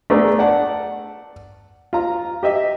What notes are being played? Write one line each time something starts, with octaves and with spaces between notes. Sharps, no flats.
A3 B3 D4 G#4 A#4
D5 F#5 A5
F4 A#5
G4 D#5 E5